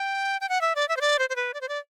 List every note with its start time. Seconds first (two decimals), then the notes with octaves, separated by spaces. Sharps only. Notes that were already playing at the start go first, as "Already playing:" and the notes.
Already playing: G5
0.41 G5
0.49 F#5
0.61 E5
0.75 D5
0.89 E5
0.97 C5
1.01 D5
1.19 C5
1.30 C5
1.36 B4
1.54 D5
1.61 C5
1.69 D5